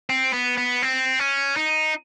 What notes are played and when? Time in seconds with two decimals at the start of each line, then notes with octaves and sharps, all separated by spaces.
0.10 C4
0.33 B3
0.58 B3
0.82 C4
1.19 C#4
1.56 D#4